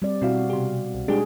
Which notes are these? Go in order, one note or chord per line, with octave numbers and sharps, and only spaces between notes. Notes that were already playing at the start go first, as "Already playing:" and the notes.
G3 C4 D5
B2 C4 E4 F#4 F5
C3 G4
C2
G3 G#3 D4 G4 G#4